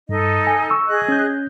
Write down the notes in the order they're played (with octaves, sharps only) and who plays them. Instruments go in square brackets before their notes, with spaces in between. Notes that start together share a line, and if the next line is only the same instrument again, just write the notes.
[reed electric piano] G2 [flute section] D#4 A4 D#5
[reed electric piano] G#5
C#6 E6
[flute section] G#4 D#5 F#6
[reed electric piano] C#4 G6